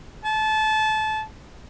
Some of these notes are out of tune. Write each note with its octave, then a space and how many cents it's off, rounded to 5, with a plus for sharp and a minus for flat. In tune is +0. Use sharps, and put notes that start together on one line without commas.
A5 -25